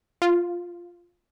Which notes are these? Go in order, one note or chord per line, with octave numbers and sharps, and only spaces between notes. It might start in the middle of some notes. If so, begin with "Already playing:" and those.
F4